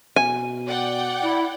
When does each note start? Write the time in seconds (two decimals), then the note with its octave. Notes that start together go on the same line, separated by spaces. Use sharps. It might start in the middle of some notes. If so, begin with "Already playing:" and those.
0.16 B2 G#5
0.68 D5 F#5 G5
1.22 E4